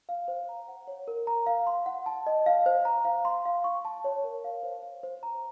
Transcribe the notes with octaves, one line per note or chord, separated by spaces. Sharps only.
F5
C5
A#5
F#5
C#5
A#4
A#5
F5
C6
F#5
A5
D#5
F5
C5
A#5
F5
C6
F5
C#6
A5
C#5
A#4
F5
C5
F5
C5
A#5